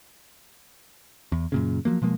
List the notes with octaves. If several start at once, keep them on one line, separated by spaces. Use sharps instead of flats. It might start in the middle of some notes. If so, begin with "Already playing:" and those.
E2
F#2 A#2 C#3
F3 F#3 A#3
B2 F3 G#3 A#3